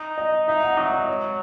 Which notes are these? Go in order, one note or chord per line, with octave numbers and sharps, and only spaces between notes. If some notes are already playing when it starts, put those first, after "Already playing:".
Already playing: D#4
D#5
D#4 E5
F#5
F#3 E5
D#5
C#5